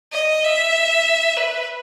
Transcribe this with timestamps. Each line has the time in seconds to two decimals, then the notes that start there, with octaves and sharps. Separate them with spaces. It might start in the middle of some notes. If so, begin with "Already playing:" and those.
0.13 D#5
0.44 E5
1.37 B4